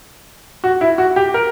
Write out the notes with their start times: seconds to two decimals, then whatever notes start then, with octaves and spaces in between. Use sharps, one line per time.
0.64 F#4
0.81 E4
0.98 F#4
1.16 G4
1.34 A#4